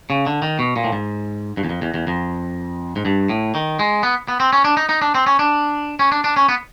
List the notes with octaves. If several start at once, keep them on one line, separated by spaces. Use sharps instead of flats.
C#3
D3
D#3
B2
A#2
A2
G#2
G2
E2
F2
E2
E2
F2
G#2
G2
A2
D#3
G#3
B3
B3
C4
C#4
D4
D#4
D#4
D4
C4
C#4
D4
C#4
D4
D4
C#4
B3